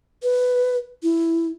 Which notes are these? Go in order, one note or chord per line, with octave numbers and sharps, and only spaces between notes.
B4
E4